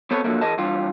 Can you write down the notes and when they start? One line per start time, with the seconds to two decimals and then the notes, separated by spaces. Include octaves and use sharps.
0.11 B3 C4 A4 B4 C#5
0.24 D3 F3 F#3 A3 A#3
0.41 E3 G#4 A#4 D#5 A5
0.58 G2 E3 G3 F4